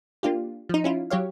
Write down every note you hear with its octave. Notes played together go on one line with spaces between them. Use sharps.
A#3 D4 F4 G4
F3 D#4
C#4 E4 F4
F#3 G4 C#5 F5